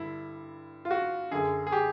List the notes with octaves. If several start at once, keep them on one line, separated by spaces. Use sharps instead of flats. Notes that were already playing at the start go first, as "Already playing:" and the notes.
Already playing: G2 D3 E4
F4
F#4
F#2 D3 G#4
G#4
G4